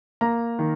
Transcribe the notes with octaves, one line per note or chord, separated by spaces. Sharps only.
A#3 A#5
D#3